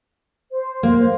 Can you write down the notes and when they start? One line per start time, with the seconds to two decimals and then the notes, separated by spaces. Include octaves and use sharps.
0.51 C5
0.83 A#3